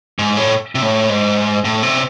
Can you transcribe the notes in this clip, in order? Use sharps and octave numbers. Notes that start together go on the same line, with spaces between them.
G#2
A2
C3
A2
G#2
A2
C3